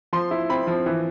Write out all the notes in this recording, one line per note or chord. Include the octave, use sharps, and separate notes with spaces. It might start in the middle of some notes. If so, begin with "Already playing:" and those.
F3 C6
E4
C4 B5
F3
E3